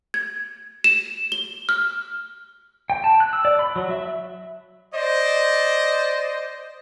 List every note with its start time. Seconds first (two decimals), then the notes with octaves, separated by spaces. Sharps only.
0.14 G#6
0.84 E7
1.32 G7
1.69 F6
2.90 G5
3.04 A5
3.20 F#6
3.33 E6
3.45 D5
3.59 B5
3.76 F#3
3.90 E5
4.94 C5 D5 D#5